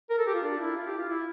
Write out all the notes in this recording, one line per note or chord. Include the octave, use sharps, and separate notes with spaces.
A#4
A4
G4
F4
D4
E4
F4
G4
F4
E4